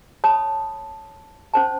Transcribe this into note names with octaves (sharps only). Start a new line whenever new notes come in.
C#5 A5 B5 D#6
C#4 C5 A5